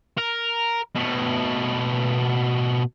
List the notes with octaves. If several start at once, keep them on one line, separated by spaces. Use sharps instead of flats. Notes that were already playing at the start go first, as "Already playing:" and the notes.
A#4
B2 A3